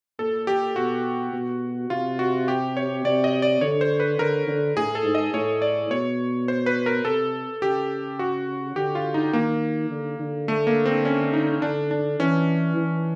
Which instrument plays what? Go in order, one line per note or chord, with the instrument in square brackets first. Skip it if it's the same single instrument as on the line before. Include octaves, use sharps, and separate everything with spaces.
[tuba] A#2 [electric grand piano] A4
[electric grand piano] G4
[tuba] B2 [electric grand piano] F#4
[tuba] B2
[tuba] C3 [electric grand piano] F4
[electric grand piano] F#4
G4
C#5
[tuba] C3 [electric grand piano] D5
[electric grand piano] D#5
D5
[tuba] D3 [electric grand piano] C#5
[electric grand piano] C5
B4
[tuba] D3 [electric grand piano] A#4
[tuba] D3
[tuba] A2 [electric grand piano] G#4
[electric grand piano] A4
[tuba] G#2
[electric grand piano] D#5
[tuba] A2 [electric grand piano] C#5
[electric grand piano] D5
[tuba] B2 [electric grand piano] C#5
[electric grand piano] C5
B4
A#4
[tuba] C3 [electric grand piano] A4
[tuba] C#3 [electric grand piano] G4
[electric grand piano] F#4
[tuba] D3 [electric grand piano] G4
[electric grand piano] F4
D#4
[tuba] D#3 [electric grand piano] A#3
[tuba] D3
D3
[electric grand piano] A3
A#3
C4
C#4
D#4
[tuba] D3 [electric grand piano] D4
[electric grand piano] D4
[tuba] E3 [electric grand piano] C#4
[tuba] E3